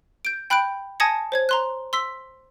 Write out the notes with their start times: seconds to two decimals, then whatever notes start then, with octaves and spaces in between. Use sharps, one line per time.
0.25 G6 D7
0.50 G5 B5 F#6 G6 D7
1.00 G#5 A5 D#6 G#6 A#6 C#7
1.32 C5 C#5 G#6
1.49 A#5 C6 F#6
1.93 C6 E6 B6